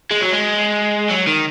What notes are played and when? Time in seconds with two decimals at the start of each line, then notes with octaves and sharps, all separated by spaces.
0.11 G#3
0.21 F#3
0.32 G#3
1.10 F#3
1.27 D#3